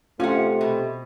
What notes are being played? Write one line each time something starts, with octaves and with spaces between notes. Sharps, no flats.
C3 A3 C#4 F4 F#5
B2